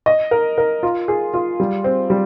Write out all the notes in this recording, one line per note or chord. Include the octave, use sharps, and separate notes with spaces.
D#5
A#4
A#4
F4
G#4
F4
G3
C4
G3